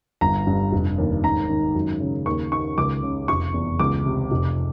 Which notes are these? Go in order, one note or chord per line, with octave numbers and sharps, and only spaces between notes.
G1 A#5
G2
F1
D#2
G#2 A#5
D#3
F#2
C#3
D#2 C#6
D#3 C#6
C#2 D6
C#3
F1 C#6
E2
C#2 D6
C3
F1